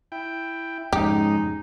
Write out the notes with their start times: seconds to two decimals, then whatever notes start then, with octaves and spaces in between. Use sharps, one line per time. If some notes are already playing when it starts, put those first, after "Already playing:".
0.12 E4 G5
0.93 F2 G#2 C#3 G#3 D#4 G4